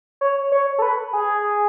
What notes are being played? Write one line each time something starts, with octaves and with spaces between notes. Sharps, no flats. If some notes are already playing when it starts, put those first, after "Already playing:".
C#5
C#5
A4
B4
G#4